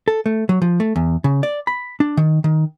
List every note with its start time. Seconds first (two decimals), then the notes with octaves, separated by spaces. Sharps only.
0.08 A4
0.26 A3
0.49 F#3
0.62 F3
0.80 A3
0.96 E2
1.24 C#3
1.43 D5
1.67 B5
2.00 D4
2.17 D#3
2.44 D#3